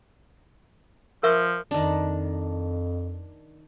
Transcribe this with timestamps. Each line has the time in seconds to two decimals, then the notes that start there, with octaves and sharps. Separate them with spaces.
1.23 F3 A#4 E5 C#6
1.71 F2 D#3 D4